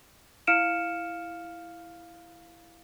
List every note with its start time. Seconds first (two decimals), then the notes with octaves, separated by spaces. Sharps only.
0.47 E4 F5 F6 C#7 D7 E7